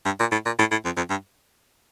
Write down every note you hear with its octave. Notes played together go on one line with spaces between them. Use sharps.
G2
A#2
A2
A#2
A2
A2
F2
F2
G2